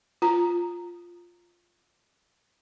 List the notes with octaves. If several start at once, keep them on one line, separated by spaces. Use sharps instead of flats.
F4 A#5